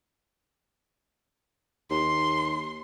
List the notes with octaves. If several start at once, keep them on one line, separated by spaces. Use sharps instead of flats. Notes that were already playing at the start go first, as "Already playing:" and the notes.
D#2 C6